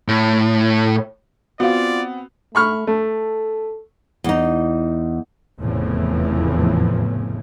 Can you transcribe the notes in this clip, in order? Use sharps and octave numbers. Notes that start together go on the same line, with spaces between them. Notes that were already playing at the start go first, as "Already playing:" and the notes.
A2
B3 C4 F4 F#4 D5 F5
A3 B5 C#6 F6
A3 A4
E2 D#4
F1 E2 A2 C#3 E3 F3